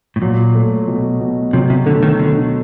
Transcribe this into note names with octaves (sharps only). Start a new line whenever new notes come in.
A2
A#2 F#3
A3
B2
B2
C3 F#3
C3
D3 A3
D#3
B2 D3